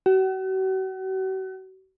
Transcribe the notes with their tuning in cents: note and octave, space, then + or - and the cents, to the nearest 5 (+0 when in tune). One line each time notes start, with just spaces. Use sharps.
F#4 +40